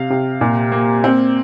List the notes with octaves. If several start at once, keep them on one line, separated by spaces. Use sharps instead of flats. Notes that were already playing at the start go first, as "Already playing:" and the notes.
Already playing: C3 F5
C3
A#2
A#3
C4